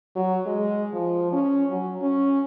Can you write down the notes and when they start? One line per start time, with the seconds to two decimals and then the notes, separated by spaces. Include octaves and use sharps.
0.16 F#3
0.46 G#3
0.93 F3
1.33 C#4
1.70 F#3
2.02 C#4